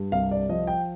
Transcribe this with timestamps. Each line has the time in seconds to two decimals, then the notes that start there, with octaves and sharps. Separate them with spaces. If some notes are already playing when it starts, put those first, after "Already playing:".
Already playing: G2
0.12 C2 F5
0.31 D5
0.49 F3 D#5
0.67 G5